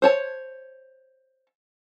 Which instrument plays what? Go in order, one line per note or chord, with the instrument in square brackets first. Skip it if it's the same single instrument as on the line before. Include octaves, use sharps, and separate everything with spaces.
[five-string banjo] C5 C#5 A5